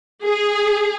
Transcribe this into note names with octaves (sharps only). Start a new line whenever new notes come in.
G#4